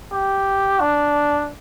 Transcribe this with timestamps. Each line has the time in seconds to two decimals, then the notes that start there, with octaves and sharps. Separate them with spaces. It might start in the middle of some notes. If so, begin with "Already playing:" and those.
0.13 G4
0.80 D4